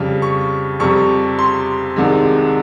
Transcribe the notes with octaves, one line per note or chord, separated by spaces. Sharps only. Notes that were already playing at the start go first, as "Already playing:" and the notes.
Already playing: F2 C#3 G3
C#6
F2 C3 G3 C#6
C6
C2 C3 D#3 G#3